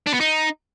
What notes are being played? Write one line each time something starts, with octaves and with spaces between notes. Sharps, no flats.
D4
B3
D#4